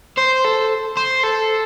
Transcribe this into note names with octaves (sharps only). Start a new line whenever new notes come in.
C5
A4
C5
A4